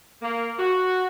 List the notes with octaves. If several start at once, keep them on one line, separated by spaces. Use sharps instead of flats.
A#3
F#4